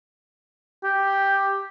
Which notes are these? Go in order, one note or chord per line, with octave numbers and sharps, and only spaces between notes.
G4